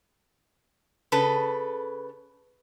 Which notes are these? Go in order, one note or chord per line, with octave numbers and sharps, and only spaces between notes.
C#3 A4 B4